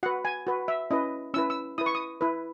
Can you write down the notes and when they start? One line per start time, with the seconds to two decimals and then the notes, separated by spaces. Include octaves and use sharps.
0.03 F#4 F#5
0.06 B4
0.25 G#5
0.47 F#4 B4
0.68 E5
0.91 C#4 E4 B4 D#5
1.34 C#4 E4 B4 E6
1.50 E6
1.78 E4 B4 D#6
1.86 C#6
1.95 D#6
2.21 E4 B4